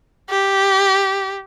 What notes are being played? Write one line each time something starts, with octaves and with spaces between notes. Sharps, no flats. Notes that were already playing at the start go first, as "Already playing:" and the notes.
G4